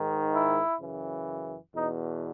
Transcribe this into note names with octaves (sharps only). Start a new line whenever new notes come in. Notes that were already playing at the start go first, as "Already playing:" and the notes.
Already playing: G#2 D#3
E4
F#2 C#3 E3
E2 B2 D#4